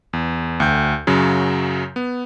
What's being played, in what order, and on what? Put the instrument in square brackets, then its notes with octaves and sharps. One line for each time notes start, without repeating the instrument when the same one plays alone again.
[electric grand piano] E2
D2 G5 G6
F#2 C#3 F#3
B3